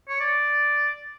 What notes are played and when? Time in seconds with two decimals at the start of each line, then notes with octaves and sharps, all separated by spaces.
0.09 C#5
0.20 D5